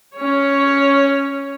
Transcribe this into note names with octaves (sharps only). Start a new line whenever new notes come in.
C#4 C#5